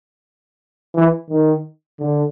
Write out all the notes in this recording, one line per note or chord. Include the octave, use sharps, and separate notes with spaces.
E3
D#3
D3